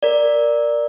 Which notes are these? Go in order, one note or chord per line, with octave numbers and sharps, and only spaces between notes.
A#4 D5